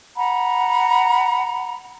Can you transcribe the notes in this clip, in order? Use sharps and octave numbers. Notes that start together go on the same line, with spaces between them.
F#5 A#5 B5